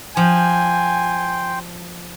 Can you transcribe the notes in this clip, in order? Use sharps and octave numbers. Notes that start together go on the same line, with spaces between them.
F3 G5 G#5 C6